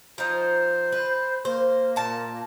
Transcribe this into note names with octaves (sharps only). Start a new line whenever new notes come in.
F3 D#4 C5
B4
A#3 C5
A#2 A5